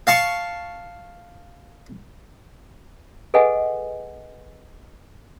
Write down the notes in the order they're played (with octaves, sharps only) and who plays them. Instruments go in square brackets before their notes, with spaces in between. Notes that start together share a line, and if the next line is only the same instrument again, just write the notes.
[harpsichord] F5 A5 C#6
[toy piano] G#4 A4 B4 D#5 F#5 G#5